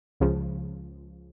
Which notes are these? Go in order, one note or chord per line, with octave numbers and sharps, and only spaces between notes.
C#2 C#3 F3